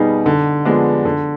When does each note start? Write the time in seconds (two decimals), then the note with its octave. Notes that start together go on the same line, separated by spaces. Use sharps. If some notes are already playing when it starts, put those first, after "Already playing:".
Already playing: B2 G3 B3 D#4 G#4
0.26 D3
0.65 F3 G#3 B3 D4
1.05 D3